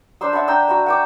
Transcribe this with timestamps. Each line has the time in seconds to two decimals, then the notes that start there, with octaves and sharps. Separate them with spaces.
0.21 D4 C5 C6 E6
0.33 E5 F#5 A5 B5
0.48 G5 A#5 E6
0.68 F#4 A#5 B5
0.86 F#5 G5 D6